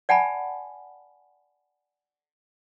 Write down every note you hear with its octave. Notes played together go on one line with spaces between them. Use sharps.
D5 F#5 G#5 A5 B5